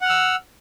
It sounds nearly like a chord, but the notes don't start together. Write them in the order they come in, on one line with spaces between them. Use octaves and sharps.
F#5 F6 E6